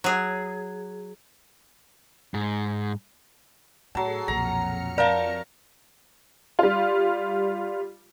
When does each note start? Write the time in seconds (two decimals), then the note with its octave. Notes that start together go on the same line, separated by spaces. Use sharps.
0.04 F#3 G#4
2.34 G#2
3.95 A2 F#3 G#4 A4 A5 C7
4.28 B1 F2 A#2 A#5 F6 C#7
4.98 A#4 D5 F5 A5 A#5
6.59 G3 F4